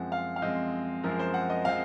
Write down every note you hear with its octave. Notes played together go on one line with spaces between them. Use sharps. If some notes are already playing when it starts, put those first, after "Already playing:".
Already playing: F#2 F3 G#3 C4 F#5
F5
F5
F#2 F3 G#3 C4 D#5
F#2 F3 G#3 C4 A#4
C5
F#5
D#5
F3 G#3 C4 F5